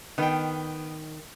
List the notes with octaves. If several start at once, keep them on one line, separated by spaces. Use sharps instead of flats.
D#3 B3 G5